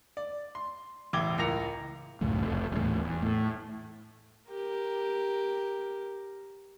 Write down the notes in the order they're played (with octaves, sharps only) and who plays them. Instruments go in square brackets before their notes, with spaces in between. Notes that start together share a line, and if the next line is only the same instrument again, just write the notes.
[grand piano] D5
C6
E1 A1 G5 D6 G#6 G7
C#2 A2 A#4 A#6 C#7 F7
[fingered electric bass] C#2 F#2 A2
F1
D#1 E2 A2
E2
A2
[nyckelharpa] G4 A#4